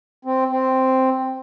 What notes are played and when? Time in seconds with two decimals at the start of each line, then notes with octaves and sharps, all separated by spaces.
0.25 C4
0.51 C4